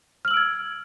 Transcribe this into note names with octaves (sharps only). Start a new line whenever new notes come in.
E6 F6 G#6 D7 F#7